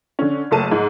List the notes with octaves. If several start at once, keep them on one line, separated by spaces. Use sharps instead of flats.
D3 C#4
F#1 C#2 A3 A5 D#7
G#2